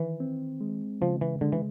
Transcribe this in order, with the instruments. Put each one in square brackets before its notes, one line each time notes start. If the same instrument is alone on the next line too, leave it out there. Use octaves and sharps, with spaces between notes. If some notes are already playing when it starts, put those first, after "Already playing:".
Already playing: [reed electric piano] D#3 [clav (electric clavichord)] E3
[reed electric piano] C4
G#3
[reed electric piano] C#3 [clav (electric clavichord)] F3
[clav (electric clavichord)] E3
[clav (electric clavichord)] D3 [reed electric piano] G#3
[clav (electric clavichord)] E3